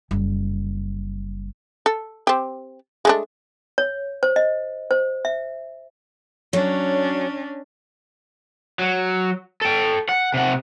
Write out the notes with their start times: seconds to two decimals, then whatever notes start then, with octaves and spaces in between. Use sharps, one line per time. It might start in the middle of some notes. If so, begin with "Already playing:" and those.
0.11 F#1 G3
1.86 A4
2.27 C4 G4
3.05 G#3 A3 D4
3.78 C#5
4.23 C5
4.36 D#5
4.91 C5
5.25 E5
6.53 F#3 C#4 D4
8.79 F#3
9.61 A4 G5
10.09 F#5
10.34 C3 F#5